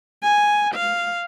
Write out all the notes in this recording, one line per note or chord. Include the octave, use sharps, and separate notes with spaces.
G#5
F5